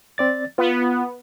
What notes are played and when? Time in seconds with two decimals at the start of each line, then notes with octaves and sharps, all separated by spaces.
0.18 C4 D5 A6
0.58 B3 F4